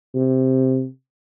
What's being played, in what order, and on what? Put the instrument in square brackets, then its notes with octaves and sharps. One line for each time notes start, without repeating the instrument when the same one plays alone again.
[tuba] C3